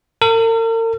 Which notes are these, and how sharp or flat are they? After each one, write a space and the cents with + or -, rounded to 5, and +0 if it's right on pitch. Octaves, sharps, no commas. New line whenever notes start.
A#4 -45